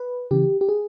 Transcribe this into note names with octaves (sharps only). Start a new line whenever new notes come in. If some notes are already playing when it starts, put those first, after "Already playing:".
Already playing: B4
C#3 E3 G4
G4
G#4